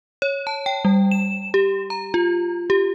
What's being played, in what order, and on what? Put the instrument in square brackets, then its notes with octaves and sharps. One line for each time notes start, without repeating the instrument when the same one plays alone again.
[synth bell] C#5
A5
G5
G3
E7
G4
A#5
F4
G4